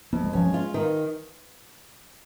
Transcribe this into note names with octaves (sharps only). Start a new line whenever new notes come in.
F2 A#3
G#3
F3 C#4
G#3
F4
D#3